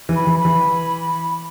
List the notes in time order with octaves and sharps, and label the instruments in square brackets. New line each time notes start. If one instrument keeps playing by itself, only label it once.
[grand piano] E3
[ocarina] B5
[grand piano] E3
[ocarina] B5
[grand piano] E3